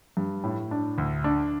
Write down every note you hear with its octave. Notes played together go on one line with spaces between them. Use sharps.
G2
A2
D4
D2
D4